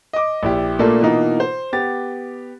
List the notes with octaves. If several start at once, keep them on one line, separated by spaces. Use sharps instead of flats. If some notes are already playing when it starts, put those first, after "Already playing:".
D#5 D6
A#1 E4 G4
A#2 A3 A#3 D4 F4 A4
B2 E3 A#3 D#4 F4
C5
B3 G4 A6